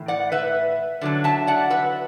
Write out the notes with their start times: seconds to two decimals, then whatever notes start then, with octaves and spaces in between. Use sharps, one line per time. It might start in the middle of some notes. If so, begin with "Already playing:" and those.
Already playing: A2 E3
0.08 D5 F#5
0.32 B4 E5
1.01 D3 F#3 D4
1.24 E5 A5
1.47 D5 F#5
1.70 B4 E5